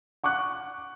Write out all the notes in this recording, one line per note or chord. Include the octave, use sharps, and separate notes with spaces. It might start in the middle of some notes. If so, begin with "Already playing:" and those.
F#5 C#6 D6 F#6